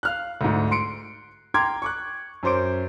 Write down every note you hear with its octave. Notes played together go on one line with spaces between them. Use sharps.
F5 F6 F#6
D2 G#2
C6 C#7 D7
G5 A#5 C6 D6 F6 G#6
C#6 D6 F#6
F#2 C#4 C5 D6 D7